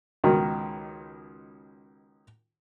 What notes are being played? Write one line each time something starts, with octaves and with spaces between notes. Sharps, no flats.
C#2 B2 D#3